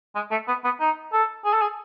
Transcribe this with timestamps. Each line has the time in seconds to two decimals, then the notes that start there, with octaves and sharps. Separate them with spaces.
0.15 G#3
0.31 A3
0.48 B3
0.64 B3
0.80 D#4
1.13 A4
1.45 G#4
1.53 A4
1.61 G#4